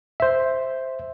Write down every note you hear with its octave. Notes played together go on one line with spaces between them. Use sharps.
C5 E5